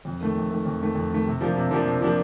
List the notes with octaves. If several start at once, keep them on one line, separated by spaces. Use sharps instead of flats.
F2
D#3 A3
F2
D#3 A3
F2
D#3 A3
F2
D#3 A3
C3
F3 A#3 D4 G4
C3
F3 A#3 D4 G4
C3
F3 A#3 D4 G4